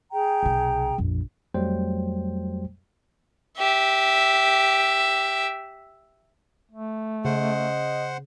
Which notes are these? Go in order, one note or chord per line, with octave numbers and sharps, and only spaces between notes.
G#4 G5 A#5
B1 C3
A#1 F2
F2 F#3 G3 A3 C5 G5
G4 E5
A3
C#3 C5 D#5 F#5